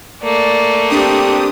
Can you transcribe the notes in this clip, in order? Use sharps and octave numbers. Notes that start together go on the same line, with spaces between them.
A3 A#3 D5
C4 D4 G4 D#6